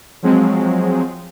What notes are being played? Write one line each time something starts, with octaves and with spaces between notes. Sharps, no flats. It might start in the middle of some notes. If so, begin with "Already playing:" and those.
F3 F#3 G#3 C4